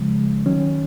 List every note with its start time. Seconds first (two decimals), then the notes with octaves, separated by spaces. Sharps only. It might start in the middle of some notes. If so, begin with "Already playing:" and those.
Already playing: C#3 F3 G#3
0.46 D#3 F#3 C#4